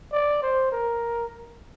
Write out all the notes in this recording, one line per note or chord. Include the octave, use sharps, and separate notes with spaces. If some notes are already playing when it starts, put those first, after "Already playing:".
D5
C5
A#4